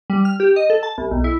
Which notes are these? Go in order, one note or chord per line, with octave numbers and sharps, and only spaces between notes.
G3
F6
G4
D#5
A4
A5
C2
B1
E4